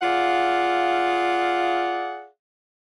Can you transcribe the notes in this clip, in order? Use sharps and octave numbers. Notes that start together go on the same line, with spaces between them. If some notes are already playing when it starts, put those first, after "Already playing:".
F4 G#4 D5 F5 F#5